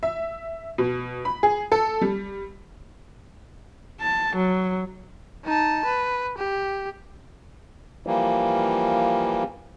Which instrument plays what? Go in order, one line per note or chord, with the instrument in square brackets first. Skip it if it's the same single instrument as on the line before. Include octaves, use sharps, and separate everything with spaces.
[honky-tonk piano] E5
B2
B5
G#4
A4
G3
[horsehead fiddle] A5
F#3
[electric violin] D#4 A5
B4
G4
[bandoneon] E3 F3 G3 A#3